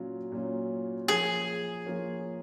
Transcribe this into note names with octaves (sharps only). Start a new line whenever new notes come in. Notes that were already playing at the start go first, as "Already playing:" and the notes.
Already playing: A#2 F#3 C#4 F4
A#2 F#3 C#4 F4
F3 A#3 F4 G#4 A#4 C#5
F3 A#3 F4 A#4 C#5